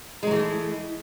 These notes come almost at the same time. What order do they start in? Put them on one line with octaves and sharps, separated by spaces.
G#3 F#3 E3 A3 E4